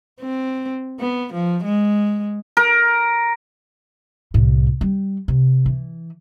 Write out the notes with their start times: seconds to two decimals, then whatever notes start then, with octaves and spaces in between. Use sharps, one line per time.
0.20 C4
1.00 B3
1.33 F3
1.64 G#3
2.57 A#4
4.34 C2 A2
4.81 G3
5.28 C3
5.66 E3